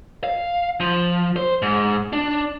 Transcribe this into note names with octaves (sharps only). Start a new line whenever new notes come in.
F5
F3
C5
G#2
D4